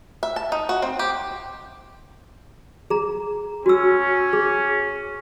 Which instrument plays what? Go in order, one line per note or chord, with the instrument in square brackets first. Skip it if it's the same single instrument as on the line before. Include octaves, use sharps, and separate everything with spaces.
[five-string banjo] E5
A5
D#4
F#4
C4
G4
[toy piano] G#4 A#5
[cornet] C#4 [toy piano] F#4 E6
[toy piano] G#4